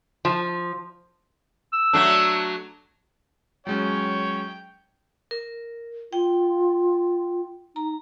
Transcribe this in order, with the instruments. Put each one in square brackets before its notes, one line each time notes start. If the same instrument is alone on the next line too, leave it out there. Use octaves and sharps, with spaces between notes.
[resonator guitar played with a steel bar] F3
[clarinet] E6
[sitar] F#3 A3 D4
[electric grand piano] F#3 G#3 C#4 [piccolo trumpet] C#5 [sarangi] G5
[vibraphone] A#4
[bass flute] F4 [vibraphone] G5
[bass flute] D#4 [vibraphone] A#5